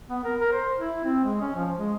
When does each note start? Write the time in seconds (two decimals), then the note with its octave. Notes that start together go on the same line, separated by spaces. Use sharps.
0.09 B3
0.24 A#4
0.40 A#4
0.53 C5
0.79 E4
1.04 C4
1.24 G#3
1.40 C#4
1.55 F3
1.77 G#3